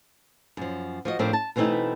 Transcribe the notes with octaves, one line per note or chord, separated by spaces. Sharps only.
F#2 F3
F3 F#4 D#5
A2 F3 C4 D4 E4 A#4
A5
B2 E3 A3 C4 D#4 E4